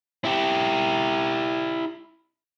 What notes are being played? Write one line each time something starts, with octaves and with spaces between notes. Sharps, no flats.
E4 G4